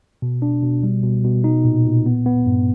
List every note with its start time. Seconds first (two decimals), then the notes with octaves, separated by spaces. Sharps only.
0.22 B2
0.42 D4
0.63 B2
0.83 G3
1.03 B2
1.25 B2
1.44 D#4
1.65 A#2
1.85 A#2
2.06 B3
2.26 B3
2.47 G2